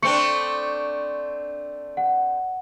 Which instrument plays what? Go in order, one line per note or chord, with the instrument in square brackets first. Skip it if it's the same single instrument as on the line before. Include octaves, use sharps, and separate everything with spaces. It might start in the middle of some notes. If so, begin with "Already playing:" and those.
[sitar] A3 C4 D4 [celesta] C#6 C#7
[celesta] F#5